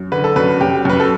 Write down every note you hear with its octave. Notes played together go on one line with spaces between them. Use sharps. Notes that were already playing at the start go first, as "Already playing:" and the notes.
Already playing: F#2
D3 B4
A4
F#2 B4
F#2 G4
F#2 B4
A4